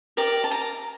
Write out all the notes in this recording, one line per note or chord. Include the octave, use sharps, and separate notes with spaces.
G4 A#4 D5 D6
A5
A#5